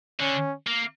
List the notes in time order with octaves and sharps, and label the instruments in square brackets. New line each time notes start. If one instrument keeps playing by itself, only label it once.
[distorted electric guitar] D3 [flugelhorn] C#4
[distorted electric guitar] A#3